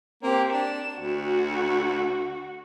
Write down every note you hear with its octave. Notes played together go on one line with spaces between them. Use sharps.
A#3 C4 G4
D4 E7
D2 F#4